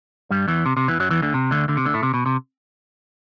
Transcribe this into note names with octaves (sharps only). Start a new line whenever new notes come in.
G2 G3
E2 E3
C3
C3
E2 E3
F#2 F#3
E2 E3
D2 D3
C3
D2 D3
D2 D3
C3
D2 D3
A2 A3
C3
B2
C3